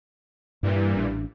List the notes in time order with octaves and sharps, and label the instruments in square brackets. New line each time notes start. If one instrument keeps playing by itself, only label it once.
[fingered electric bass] G2 [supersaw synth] A#2 E3 G3
[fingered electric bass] A1 D4